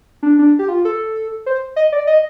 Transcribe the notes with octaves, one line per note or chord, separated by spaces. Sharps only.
D4
D4
G4
F4
A4
C5
D#5
D5
D#5